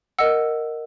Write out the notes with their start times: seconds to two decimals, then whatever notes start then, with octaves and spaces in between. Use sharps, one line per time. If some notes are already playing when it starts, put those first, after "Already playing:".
0.19 A#4 D#5 F#5 E6